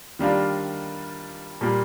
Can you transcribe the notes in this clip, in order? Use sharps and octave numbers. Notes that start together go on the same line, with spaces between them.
D#3 G3 A#3 D4 F4
A#2 G3 A#3